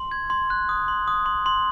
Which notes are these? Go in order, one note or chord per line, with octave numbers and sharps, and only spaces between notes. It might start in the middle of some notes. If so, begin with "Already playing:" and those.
Already playing: C6
G#6
C6
F#6
D#6
C6
D#6
C6
C6